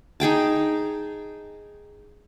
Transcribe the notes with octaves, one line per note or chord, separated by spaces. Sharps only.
D#4 G#4 G5 A5